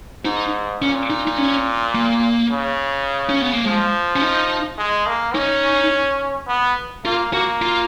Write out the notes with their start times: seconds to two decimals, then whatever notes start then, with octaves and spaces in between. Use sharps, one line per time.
0.25 G#2 D#4
0.82 A#2 C#4
1.10 D#4
1.28 D#4
1.38 C#4
1.95 A#3
2.51 C#3
3.29 C#4
3.41 B3
3.53 A#3
3.65 F3 G#3
4.16 C#4
4.22 D#4
4.78 G#3
5.07 A#3
5.35 C#4 D#4
6.48 B3
7.05 A#3 F4
7.33 A#3 F#4
7.62 F4